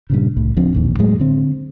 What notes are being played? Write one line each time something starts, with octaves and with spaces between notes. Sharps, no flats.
G2 A#2 C#3
C2 A2
C#2 F3 C4 D4
E1 A#1 D#2
A2 F#3 G#3
D3 C4